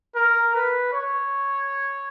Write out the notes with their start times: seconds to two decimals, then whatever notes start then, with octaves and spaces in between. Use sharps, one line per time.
0.15 A#4
0.54 B4
0.93 C#5